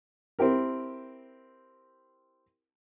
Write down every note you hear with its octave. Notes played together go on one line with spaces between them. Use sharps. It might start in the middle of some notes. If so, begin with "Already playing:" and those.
C4 E4 G4 A#4